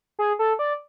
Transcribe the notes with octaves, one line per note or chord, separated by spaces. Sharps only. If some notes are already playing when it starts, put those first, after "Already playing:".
G#4
A4
D5